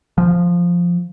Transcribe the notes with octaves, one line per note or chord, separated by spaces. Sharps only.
F3